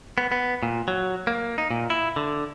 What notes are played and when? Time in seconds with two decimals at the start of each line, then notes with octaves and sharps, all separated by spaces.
0.18 B3
0.32 B3
0.63 A#2
0.88 F#3
1.27 A#3
1.58 D#4
1.71 A#2
1.90 E4
2.16 D3